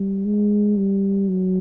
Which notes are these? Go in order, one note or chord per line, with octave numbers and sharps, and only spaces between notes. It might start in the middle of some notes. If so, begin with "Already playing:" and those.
Already playing: G3
G#3
G3
F#3